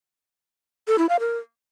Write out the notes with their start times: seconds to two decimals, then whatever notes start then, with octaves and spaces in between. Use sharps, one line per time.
0.88 A4
0.99 E4
1.09 F5
1.20 A#4